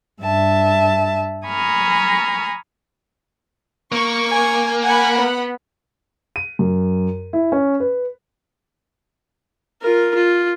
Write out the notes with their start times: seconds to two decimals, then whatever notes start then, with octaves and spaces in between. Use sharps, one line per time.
0.22 G2 E5 A5
1.47 G#5 A#5 B5 C#6 D#6 F6
3.92 A#3 C#6
4.29 G#5
4.83 F#5 G#5 B5
5.18 B3
6.36 D#7
6.59 F#2
7.33 E4
7.52 C#4
7.80 B4
9.82 F4 A#4
10.15 F4